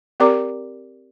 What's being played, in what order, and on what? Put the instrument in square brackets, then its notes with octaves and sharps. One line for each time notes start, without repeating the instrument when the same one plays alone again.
[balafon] C4 G4 A#4 D5 A#5 D6